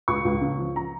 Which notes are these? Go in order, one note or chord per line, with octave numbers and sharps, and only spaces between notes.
C#2 C#6
C#2
C#3
F3
A#5